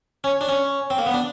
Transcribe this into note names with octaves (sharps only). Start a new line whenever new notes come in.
C#4
D4
C#4
C4
A#3
B3
D4